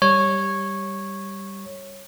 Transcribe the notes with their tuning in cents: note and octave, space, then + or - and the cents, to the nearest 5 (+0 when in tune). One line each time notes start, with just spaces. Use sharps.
G3 +0 C#5 -10